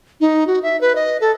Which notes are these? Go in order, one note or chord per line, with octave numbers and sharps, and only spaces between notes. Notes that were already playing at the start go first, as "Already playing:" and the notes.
D#4
F#4
E5
B4
D#5
A4